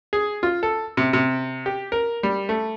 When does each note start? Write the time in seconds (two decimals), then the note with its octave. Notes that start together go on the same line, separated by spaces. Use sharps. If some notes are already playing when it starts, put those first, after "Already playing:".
0.13 G#4
0.43 F4
0.63 A4
0.97 C3
1.13 C3
1.66 G4
1.92 A#4
2.23 G3
2.49 A3